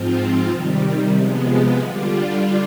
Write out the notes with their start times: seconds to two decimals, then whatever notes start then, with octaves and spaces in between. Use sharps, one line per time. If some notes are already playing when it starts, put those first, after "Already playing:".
Already playing: G#2 F3 C4 F4
0.48 C3 D#3 G3
1.14 C3 F3 G#3 B3
1.79 D3 G3 D4 F4